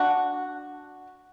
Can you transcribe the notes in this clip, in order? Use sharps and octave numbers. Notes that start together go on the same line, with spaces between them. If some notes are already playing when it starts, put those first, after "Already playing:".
Already playing: D4 F#4